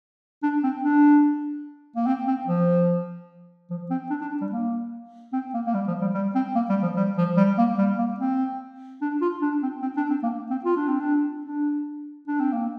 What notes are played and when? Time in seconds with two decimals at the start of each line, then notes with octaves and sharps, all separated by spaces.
0.43 D4
0.63 C4
0.84 D4
1.96 A#3
2.07 C4
2.28 C4
2.47 F3
3.70 F3
3.90 C4
4.10 D4
4.21 D4
4.41 G3
4.52 A#3
5.33 C4
5.54 A#3
5.66 A#3
5.74 G3
5.88 F3
6.01 G3
6.15 G3
6.35 C4
6.55 A#3
6.70 G3
6.83 F3
6.97 G3
7.18 F3
7.37 G3
7.58 A#3
7.78 G3
7.99 A#3
8.20 C4
9.02 D4
9.21 F4
9.42 D4
9.62 C4
9.82 C4
9.97 D4
10.10 C4
10.23 A#3
10.51 C4
10.65 F4
10.77 D4
10.88 C4
11.00 D4
11.46 D4
12.28 D4
12.40 C4
12.53 A#3